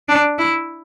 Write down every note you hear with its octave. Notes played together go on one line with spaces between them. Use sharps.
D4
E4